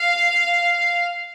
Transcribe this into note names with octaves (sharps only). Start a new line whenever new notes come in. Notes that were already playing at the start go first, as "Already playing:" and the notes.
Already playing: F5